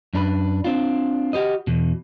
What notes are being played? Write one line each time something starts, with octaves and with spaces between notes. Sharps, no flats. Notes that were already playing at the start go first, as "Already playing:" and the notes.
F#2 D4 A#4 B4
C4 D4 F4
F#4 G4 C5 D#5
E2 B2